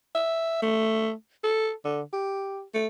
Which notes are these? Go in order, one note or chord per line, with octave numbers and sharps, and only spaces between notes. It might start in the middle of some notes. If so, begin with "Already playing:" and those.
E5
A3
A4
D3
G4
A3